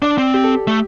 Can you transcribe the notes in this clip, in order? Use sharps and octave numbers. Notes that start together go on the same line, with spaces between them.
D4 D5
C4
G4
A4
G4
A3